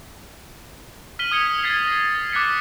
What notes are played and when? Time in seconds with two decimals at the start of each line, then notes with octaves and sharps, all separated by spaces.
1.19 F6 B6 D#7 F#7 G7
1.31 D#6 G#6 C#7 G7
1.63 G#6 A6 B6 C7 G7
1.87 A#6
2.33 D6 F#6 A6 B6 C#7